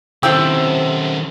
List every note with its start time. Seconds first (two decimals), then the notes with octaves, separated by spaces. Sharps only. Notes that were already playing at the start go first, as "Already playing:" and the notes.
0.23 C3 D#3 C4 C#4 E4 A4 G5 E6